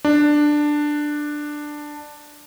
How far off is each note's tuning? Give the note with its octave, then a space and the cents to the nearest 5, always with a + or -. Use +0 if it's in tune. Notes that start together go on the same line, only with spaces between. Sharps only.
D4 +10